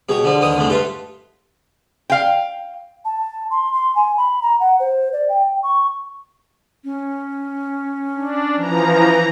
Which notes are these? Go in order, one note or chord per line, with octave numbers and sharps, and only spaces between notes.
B2 G4 G#4 C#5 G5
D3 F3 G3
D#2 D#3 E3 D#6
C2 A2 G#3
F4 G4 A4 B4 E5
F5 G5
A5
C6
C6
G#5
B5
A#5
F#5
C5
D5
G5
C#6
C#4
D4
E3 F3 A#5